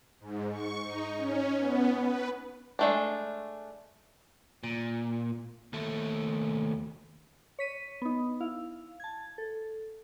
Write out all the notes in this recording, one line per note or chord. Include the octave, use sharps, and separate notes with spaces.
G#2
C#6
D#4
C#4
B3
B4
G#3 A3 D4
A#2
D#2 A3
C#5 B6 D#7
B3 D#4
E4 F5
A5 G#6
A4